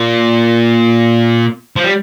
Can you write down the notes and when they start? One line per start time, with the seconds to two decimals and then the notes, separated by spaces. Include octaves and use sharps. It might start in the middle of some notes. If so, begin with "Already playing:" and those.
Already playing: A#2
1.76 F3
1.84 G3